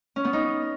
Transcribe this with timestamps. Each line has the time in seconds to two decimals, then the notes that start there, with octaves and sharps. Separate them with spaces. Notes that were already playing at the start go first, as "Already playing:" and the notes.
0.16 C#4
0.25 B3
0.33 D#4